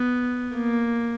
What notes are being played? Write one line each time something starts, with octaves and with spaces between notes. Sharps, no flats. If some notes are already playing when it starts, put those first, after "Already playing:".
Already playing: B3
A#3